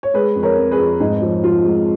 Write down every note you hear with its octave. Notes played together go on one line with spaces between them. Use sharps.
C#5
G#3 G#4 B4
F2
A#4 C#5
F2
G#4 B4
F2
G#2 D#4
F3
F3 F4
G#3